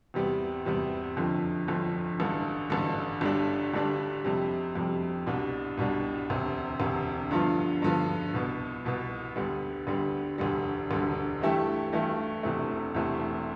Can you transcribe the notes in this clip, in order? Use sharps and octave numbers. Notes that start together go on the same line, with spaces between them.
E2 C3 G3 B3
E2 C3 G3 B3
G1 F2 D3 F3
G1 F2 D3 F3
A1 G2 D3
A1 G2 D3
G1 G2 D3 G3 D4
G1 G2 D3 G3 D4
F2 C3 G3
F2 C3 G3
C2 B2 G3 D4
C2 B2 G3 D4
E1 D2 C3
E1 D2 C3
G2 D3 F3 B3 F4
G2 D3 F3 B3 F4
C2 B2 B3
C2 B2 B3
D2 D3 G3 B3
D2 D3 G3 B3
E1 D2 D3 G3
E1 D2 D3 G3
G2 E3 A3 E4 G4
G2 E3 A3 E4 G4
E1 E2 C3 E3 A3
E1 E2 C3 E3 A3